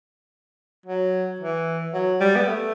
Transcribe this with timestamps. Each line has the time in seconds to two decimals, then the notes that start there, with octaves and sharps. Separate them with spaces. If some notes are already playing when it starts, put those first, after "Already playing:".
0.86 F#3
1.41 E3
1.94 F#3
2.21 G3
2.36 B3
2.47 A3